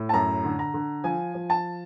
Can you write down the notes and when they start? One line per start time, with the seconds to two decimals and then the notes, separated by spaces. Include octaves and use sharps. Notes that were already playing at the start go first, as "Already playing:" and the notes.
Already playing: A2
0.09 A5
0.13 F#2 A#5
0.44 D3
0.59 A#5
0.74 D3
1.04 F3 G#5
1.35 F3
1.50 A5